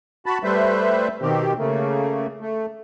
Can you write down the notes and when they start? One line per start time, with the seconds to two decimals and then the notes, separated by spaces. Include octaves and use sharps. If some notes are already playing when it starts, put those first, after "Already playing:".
0.26 F#4 A5 B5
0.44 G3 A3 B4 C5 E5
1.21 B2 D#3 C4 G4
1.58 C#3 A3 A#3
2.40 A3